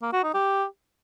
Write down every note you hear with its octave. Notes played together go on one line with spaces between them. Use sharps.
A#3
F#4
D#4
G4